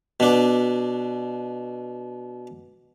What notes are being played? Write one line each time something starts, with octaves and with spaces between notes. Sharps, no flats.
B2 D4